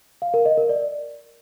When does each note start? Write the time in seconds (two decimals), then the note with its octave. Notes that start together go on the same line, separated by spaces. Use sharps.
0.22 F5
0.34 A#4
0.46 D#5
0.57 A#4
0.69 D5